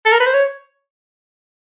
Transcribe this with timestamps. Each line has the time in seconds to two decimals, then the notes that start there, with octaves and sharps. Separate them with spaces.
0.06 A4
0.12 A#4
0.20 B4
0.27 C5
0.34 C#5